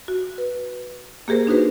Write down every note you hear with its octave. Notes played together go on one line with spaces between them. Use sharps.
F#4
B4
A#3 G4 G#4 A#4 C5
D4 D#4 F#4 B4 C5